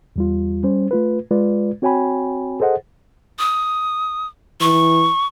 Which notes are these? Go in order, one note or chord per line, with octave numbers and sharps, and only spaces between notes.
E2 G3 F4
G3 C#4 C5
A3 F4 B4
G#3 F4 B4 D5
C4 F#4 C#5 G5 G#5 B5
G#4 A4 C5 D#5 F#5
D#6
E3 C#6